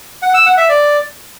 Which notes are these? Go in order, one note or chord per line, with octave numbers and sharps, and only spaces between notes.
F#5
E6
F#5
E5
D5